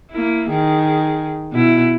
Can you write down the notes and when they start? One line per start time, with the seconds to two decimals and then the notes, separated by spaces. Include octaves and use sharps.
0.11 A#3 E4
0.50 D#3 G#4
1.53 B2 E4